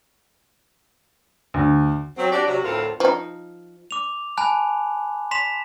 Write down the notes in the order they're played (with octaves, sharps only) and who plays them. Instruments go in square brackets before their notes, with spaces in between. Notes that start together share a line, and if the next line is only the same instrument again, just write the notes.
[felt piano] D2
[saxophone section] F#3 C4
D4 F#4 G4 D5
C3 F#3 F#4
D2 A2 C4 F4 A4 A#4
[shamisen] F3 D#4
[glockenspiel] D6 F7
G#5 A5 B5 F#6
C6 B6 E7 F7